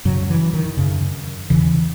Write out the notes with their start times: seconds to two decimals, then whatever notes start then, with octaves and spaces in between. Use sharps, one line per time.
0.05 F#2 C#3 F#3
0.29 E3
0.53 D#3
0.77 F#2 C#3
1.50 E2 C#3 E3